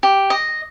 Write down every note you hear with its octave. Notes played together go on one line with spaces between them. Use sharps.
G4
D#5